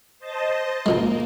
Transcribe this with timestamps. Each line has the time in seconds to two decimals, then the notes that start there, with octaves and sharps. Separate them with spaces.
0.19 C5 D#5 A5
0.86 C#2 A#2 G#3 A#3